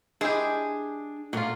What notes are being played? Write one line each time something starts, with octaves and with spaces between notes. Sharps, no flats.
G#3 D4 E4 G4 G#4
A#2 F#3 A3 F4